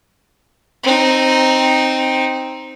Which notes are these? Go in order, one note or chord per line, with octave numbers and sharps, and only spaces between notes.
C4 D#4